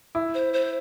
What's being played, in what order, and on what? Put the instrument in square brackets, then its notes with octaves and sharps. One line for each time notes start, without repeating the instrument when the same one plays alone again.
[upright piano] E4
[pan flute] C5
C5